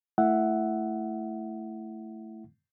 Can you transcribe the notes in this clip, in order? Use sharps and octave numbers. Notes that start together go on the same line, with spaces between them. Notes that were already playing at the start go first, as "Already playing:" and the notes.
A3 E4 E5 F#5